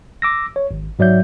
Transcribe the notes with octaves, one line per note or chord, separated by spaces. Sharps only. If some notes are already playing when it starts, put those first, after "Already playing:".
D6 E6 A#6
C#5
G#1
G#2 F#3 D5 E5 G6